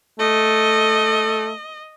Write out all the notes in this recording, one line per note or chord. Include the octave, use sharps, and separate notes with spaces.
A3 D#5